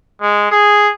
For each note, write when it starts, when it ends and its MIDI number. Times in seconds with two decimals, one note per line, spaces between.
0.21 0.49 56
0.51 0.90 68